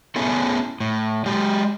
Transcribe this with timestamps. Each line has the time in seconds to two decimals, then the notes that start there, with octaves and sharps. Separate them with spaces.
0.16 A3 B3 C#4 E4 G#4 A4
0.80 A2
1.26 F#3 G#3 G4